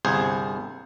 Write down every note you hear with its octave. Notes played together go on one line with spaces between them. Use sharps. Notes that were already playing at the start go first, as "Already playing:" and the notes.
G1 C2 G#4 C5